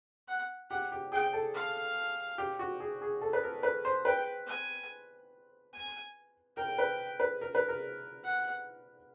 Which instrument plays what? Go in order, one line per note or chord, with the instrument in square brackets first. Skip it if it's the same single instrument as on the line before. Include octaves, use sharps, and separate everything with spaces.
[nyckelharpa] F#5
[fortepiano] G4 [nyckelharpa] F#5
[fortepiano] G4
[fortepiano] G#4 [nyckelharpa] G5
[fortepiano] A4
[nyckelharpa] F5
[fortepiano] G4
F#4
G#4
G#4
A4
B4
A#4
B4
C5
[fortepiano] B4 [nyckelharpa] G5
[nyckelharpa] G#5
G#5
[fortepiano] A#4 [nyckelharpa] G5
[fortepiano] B4
B4
A#4
B4
A#4
[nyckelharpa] F#5